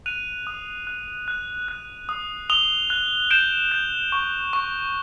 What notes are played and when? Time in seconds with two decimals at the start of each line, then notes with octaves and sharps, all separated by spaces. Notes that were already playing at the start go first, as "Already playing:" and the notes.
0.06 F#6 D#7 F7
0.47 D#6
0.87 F#6
1.28 F#6
1.68 F#6
2.09 D#6
2.50 D#6 F7 G7
2.90 F#6
3.31 G6 D7 E7
3.72 G6
4.12 C#6
4.53 C#6